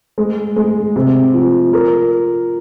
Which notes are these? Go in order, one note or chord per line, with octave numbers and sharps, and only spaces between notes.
G#3
G#3
C3
F3
A#4